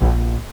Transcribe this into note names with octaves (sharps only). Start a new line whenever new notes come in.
A#1